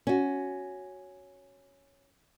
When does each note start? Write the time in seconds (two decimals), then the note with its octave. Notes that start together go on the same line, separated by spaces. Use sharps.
0.07 C#4 F#4